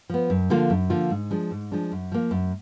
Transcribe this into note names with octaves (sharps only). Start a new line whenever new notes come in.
F3 B3
F#2
D3 F3 A#3 F4
F#2
D3 F3 A#3 F4
G#2
F3 G#3 D4
G#2
F3 G#3 D4
F#2
F3 A#3
F#2